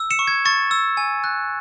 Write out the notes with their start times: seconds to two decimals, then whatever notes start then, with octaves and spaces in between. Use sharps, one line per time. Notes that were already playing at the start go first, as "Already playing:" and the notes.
Already playing: E6
0.11 C#7 E7
0.19 C#6
0.27 G#6
0.45 C#6 A6
0.71 E6
0.97 G#5
1.24 F#6